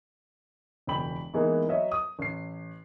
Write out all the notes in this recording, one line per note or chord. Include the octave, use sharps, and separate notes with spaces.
E1 C#2 F#2 G5 B5 F#7
E3 G#3 A#3 B3 D#4
F#3 B4 C#5 D#5 E5
D#6
A1 C7